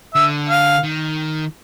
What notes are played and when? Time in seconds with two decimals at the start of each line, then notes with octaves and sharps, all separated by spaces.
0.15 D3 E5
0.49 F5
0.83 D#3